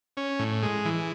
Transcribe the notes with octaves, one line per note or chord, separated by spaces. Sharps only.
C#4
A2
G#3
E3